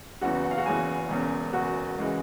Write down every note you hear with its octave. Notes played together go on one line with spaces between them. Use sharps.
F#1 E2 C#3 E3 F#4 F#5
F#5
F5
F#4 F#5
F#1 E2 C#3 E3 G#4 G#5
E1 E2 C#3
E1 E2 C#3 F#4 F#5
C#3 E3 G#3